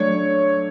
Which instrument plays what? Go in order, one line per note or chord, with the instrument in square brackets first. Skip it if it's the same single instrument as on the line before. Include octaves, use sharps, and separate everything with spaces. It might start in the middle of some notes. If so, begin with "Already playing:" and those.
Already playing: [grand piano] F#3 A3 D4 [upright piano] C#5